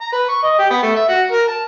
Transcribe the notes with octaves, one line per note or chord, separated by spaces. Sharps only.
A#5
B4
C#6
D#5
G4
B3
A3
E5
F#4
A#4
A5